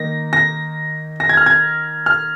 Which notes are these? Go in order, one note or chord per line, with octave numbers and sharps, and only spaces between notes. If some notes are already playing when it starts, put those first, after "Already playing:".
Already playing: D#3 A#3 D#4 A#6
A#6
A#6
G#6
F6
G#6
F6